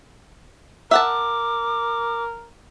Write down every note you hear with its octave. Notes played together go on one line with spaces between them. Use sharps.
A#4 E5 F#5 A5 D6